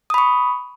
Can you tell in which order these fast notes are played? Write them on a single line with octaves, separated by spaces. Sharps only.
D#6 B5 C#6